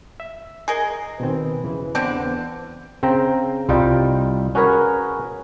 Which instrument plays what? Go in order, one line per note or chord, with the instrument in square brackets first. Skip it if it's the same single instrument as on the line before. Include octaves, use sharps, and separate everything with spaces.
[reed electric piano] E5
[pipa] G#4 A#4 D#5
[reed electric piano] B2 D#3 C4 [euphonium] B4
[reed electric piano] E2 C#3 E3
[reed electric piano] E2 [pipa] D3 C4 D4 [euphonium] B3
[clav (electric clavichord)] C#3 C4 G5 A#5
C2 G3 F4 D#5 G5
C#4 F#4 G#4 A#4 B4 C#5